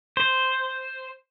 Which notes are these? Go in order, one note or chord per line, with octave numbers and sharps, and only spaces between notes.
C5